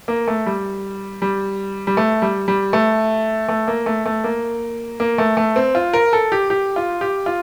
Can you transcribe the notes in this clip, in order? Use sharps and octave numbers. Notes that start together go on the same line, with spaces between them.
A#3
A3
G3
G3
G3
A3
G3
G3
A3
A3
A#3
A3
A3
A#3
A#3
A3
A3
C4
F4
A#4
A4
G4
G4
F4
G4
F4